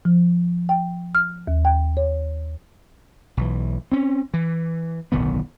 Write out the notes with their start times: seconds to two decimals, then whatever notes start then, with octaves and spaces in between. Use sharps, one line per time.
0.05 F3
0.69 G5
1.15 F6
1.48 D#2
1.65 G5
1.97 C#5
3.37 B1 E3
3.92 C4 C#4
4.34 E3
5.12 D1 B1 D#3 B3